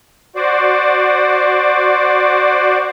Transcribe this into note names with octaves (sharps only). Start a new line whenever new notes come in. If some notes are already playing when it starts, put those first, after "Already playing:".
F#4 C5 D5